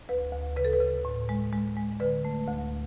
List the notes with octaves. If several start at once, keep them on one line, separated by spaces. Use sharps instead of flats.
D2 B4
D2
C#3 B4
A4
B4
C#3
A2
G#3
G#3
G#3
D3 B4
A3
D2